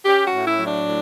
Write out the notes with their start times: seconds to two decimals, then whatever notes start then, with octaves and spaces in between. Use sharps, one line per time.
0.06 C#4 G4
0.26 F#4
0.32 A2
0.46 E4
0.58 F#3
0.65 D4
0.85 A2